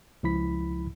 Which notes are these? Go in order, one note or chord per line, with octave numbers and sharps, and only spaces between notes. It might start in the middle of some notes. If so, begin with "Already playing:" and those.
C#2 F3 E4 B5 B6